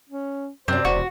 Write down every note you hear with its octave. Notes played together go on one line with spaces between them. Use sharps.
C#4
F#2 C3 C4 G4 C5 D5
E1 F#4 C5